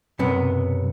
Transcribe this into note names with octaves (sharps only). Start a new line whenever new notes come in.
B1 F#2 C3 B3